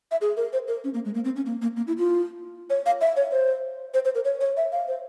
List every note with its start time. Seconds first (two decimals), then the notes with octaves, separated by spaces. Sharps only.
0.11 E5
0.21 G#4
0.37 A#4
0.53 C5
0.68 A#4
0.84 C#4
0.94 A#3
1.05 G#3
1.15 A#3
1.25 C4
1.36 C#4
1.46 A#3
1.62 A#3
1.77 A#3
1.87 E4
1.98 F4
2.70 C#5
2.86 F5
3.01 E5
3.17 C#5
3.32 C5
3.94 C5
4.05 C5
4.15 A#4
4.25 C#5
4.41 C#5
4.57 E5
4.72 F5
4.88 C5